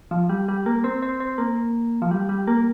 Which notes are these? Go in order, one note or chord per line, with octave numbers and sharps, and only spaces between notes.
F3
G3
G3
A#3
C4
C4
C4
A#3
F3
G3
G3
A#3